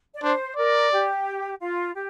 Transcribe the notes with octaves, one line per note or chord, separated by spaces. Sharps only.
D5
D4 C5
A#4 D5
G4
F4
G4